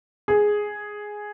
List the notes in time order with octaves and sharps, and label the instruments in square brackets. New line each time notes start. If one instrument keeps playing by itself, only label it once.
[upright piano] G#4